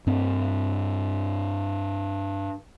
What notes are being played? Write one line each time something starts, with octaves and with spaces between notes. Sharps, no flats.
G2 C4